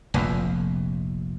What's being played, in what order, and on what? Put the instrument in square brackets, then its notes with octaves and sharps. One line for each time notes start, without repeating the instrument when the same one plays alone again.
[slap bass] F1 A#1 F2